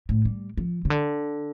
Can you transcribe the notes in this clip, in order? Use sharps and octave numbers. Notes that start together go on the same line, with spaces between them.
A2
G3
F3
C#3
D3